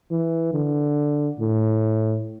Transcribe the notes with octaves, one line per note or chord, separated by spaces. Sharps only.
E3
D3
A2